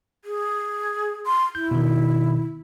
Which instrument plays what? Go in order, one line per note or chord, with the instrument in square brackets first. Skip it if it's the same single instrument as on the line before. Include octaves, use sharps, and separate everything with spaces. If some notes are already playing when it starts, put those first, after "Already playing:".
[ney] G#4
C6
[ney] E4 [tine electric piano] G6
[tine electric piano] B2 D#3